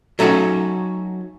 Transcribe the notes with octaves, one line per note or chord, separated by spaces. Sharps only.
F#3 A3 C#4 D#4 F#4